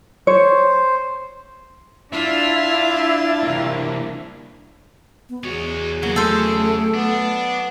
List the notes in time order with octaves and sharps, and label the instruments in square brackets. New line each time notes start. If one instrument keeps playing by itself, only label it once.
[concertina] C5 [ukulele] C#5
[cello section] D4 [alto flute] E4 [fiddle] F4 [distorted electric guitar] E5
[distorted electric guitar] C2 A#3
[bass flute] B3
[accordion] E2 [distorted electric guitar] G#3 C#5 [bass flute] F#4
[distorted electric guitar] C#3 G#4 [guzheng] F#3 [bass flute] A#3
[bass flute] A3 [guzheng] A4 C5
[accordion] B3 [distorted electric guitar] D4